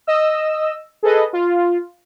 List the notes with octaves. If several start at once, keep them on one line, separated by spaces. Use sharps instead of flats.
D#5 E6
G#4 A4 B4 D#5
F4